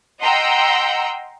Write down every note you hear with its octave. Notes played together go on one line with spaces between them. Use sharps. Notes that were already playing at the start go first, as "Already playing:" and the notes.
D#5 F#5 G5 A#5 C6 E6